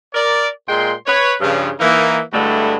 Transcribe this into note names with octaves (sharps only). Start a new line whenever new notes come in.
A#4 D5
A#2 G#3 G5 C6
B4 C#5
G2 C#3 F3
E3 A#3 D#4
G2 D3 G#3 A3 E4 F#4